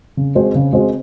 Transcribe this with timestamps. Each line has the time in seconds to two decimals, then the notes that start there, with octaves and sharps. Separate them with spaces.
0.17 C#3
0.35 G#3 C4 F#4 C5
0.55 C#3
0.73 G#3 C4 F#4 C5